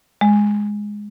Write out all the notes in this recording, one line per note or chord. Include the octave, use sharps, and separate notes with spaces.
G#3